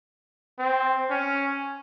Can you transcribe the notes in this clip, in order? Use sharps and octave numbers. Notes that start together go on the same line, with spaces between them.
C4
C#4